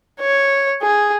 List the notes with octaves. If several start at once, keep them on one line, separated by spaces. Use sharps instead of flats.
C#5
G#4